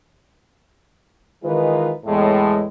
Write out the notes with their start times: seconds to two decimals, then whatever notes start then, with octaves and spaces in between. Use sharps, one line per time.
1.44 D#3 E3 G#3 D#4 F4 B4
2.06 E2 A2 G#3